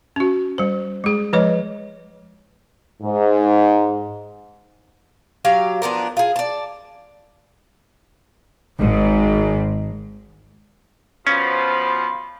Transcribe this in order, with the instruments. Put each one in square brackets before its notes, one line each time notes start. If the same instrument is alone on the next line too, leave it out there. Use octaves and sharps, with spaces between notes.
[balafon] C#4 F#4
G3 C5
G#3 G#4
F3 G#3 B4 C#5 D#5
[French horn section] G#2
[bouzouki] F#3 G4 F5
F3 B3 D4 A#4
F4 G#4
D5 A5
[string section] G#1 G#2
[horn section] B2 F3 [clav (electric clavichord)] C#4 [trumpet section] B5 C6